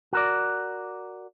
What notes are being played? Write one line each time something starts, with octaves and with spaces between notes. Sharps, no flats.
F#4 A#4 D5